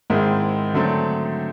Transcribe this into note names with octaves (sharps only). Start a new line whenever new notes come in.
G#2 D#3 G#3 C4 E4
D3 F#3 A3 C4